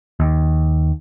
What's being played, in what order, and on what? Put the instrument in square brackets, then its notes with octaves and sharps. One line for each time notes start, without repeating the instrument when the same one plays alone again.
[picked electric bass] D#2